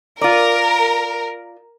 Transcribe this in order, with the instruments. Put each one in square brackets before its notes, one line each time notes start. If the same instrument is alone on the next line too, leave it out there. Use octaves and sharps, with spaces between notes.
[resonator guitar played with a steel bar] F4 D5 [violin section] A#4